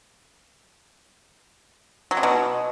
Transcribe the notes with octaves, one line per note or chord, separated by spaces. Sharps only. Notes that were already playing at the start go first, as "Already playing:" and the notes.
F#3
C3
B2